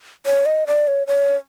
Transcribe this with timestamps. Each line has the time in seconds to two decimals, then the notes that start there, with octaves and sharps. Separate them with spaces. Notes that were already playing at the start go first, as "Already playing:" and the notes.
0.26 C#5
0.46 D#5
0.67 D5
0.88 C#5
1.07 C#5